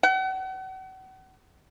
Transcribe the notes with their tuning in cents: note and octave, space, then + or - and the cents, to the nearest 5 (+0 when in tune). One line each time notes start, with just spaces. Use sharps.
F#5 +40